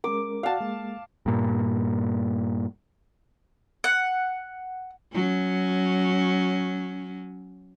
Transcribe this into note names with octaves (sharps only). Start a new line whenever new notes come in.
G#3 C#4 A#4 D6
F#4 D5 F5 F#5 A5
G#3 A#3
G2 A#2
F#5
F#3 C#4